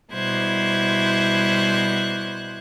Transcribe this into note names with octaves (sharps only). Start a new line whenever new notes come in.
B2 G3 E4 C5 F#6 G#6